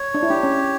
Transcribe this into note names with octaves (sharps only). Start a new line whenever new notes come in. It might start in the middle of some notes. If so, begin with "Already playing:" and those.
Already playing: C#5
D4
E4
D4 G4
C#4